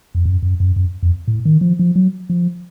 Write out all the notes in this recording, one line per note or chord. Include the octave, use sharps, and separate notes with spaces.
F2
F#2
F#2
F#2
F#2
F2
A2
D#3
F3
F3
F#3
F3